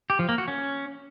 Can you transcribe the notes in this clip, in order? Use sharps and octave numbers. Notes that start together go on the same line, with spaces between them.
G4
F3
A#3
F#4
C#4